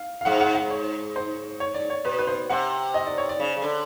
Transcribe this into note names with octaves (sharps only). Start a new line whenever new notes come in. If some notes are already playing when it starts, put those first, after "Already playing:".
Already playing: F5
F5
G#2 F#5
F#5
F#5
C#5
C5
C#5
D5
C#5
B2 B4
B4
C5
C3 F#5
D#5
D5
C#5
D5
C#3
C#3
D3